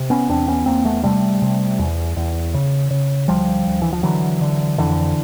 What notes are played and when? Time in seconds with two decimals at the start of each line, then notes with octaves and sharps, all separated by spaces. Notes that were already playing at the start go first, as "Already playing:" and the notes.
Already playing: C3
0.10 B3 C#4
0.29 E2 C4 D4
0.48 B3 C#4
0.66 E2 A#3 C4
0.85 A3 B3
1.03 C3 G3 A3
1.42 C3
1.79 E2
2.16 E2
2.54 C#3
2.91 C#3
3.28 D2 F3 G3
3.66 D2
3.82 E3
3.93 F3
4.03 D3 E3 F#3
4.41 D3
4.78 F2 D3 E3